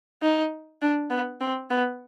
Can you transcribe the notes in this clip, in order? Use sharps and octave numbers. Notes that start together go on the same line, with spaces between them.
D#4
D4
B3
C4
B3